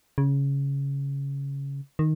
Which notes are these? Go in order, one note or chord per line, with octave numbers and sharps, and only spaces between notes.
C#3
D#3